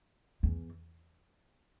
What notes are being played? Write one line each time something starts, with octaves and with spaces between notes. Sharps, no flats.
E2